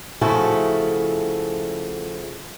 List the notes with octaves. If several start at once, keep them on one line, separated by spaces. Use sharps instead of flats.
C#3 F3 A3 E4 F#4 A4